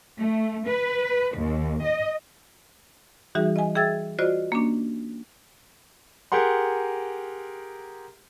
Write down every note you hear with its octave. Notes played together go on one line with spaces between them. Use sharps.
A3
B4
D#2
D#5
E3 G3 D#4 F#4 G#4 E5
D#5 G#5
G#4 E5 G5 E6 G#6 A6
F4 F#4 C5 D5 D#5
A#3 C#4 D4
G4 G#4 A#4 F#5 C6